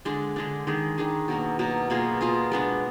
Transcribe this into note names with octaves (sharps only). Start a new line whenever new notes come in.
D3 G#3 D4
D3 G#3 D4
D#3 G#3 D4 G#4
D#3 G#3 D4 G#4
B2 F#3 A#3
B2 F#3 A#3
B2 A#3 F4 G#4
B2 A#3 F4 G#4
G#3 B3 D4